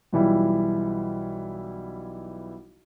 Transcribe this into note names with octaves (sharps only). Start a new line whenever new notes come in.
B1 E3 G3 E4 F4